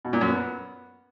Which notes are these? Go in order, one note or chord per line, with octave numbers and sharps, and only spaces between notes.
B2
A#2
F#2
B3